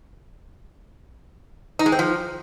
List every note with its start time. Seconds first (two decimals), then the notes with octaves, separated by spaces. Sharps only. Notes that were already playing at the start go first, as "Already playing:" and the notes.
1.79 D#4
1.86 G#3
1.92 C4
1.99 F3